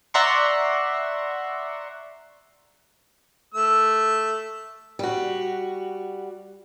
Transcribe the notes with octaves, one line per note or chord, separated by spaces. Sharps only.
D5 E5 F#5 A#5 C6 C#6
A3 E6
G3 F#4